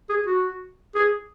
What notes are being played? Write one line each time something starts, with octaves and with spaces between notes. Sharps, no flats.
G#4
F#4
G#4